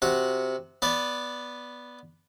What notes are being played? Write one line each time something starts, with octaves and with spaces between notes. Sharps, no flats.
C3 F#4 F#5
B3 B4 D5